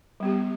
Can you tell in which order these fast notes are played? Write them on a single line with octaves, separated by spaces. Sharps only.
G3 B3 G4